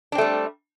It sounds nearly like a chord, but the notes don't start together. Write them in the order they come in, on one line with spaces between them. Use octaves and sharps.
D4 C4 A3 G3